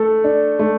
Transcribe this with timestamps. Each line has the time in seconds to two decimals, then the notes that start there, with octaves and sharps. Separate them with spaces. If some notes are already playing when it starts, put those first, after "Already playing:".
Already playing: A3 A4
0.24 D4
0.59 A3